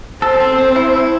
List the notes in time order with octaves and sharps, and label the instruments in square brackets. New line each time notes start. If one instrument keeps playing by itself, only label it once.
[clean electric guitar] A4 [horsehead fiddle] C5
[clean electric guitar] C4
C4
E4
E4